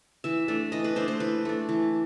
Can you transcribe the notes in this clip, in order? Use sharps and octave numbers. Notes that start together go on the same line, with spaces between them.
E3 E5
A3 D4
E3 D#5
B4
A3 D4 C5
C5
E3 B4
A3 D4
E3